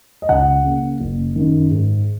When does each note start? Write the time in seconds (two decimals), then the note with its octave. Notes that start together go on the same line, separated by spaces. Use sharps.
0.22 D#5
0.29 C#2 F#5
0.64 C#3 A#3
1.00 F#1
1.36 F#2 D#3
1.71 G#2